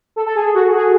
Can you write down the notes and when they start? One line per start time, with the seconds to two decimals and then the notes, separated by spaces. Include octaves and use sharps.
0.16 A4
0.26 A4
0.35 G#4
0.45 A4
0.54 F#4
0.77 G#4